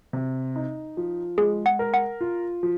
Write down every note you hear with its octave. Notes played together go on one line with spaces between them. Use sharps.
C3
D#4
F3
G#3 G#4
F#5
A#4
F#5
F4
F3